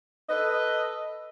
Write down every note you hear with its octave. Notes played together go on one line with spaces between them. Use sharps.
A4 B4 D#5